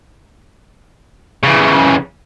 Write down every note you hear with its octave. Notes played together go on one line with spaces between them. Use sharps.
C#3 E3